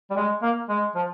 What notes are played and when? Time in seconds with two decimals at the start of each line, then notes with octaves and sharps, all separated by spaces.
0.10 G3
0.16 G#3
0.42 A#3
0.69 G#3
0.95 F3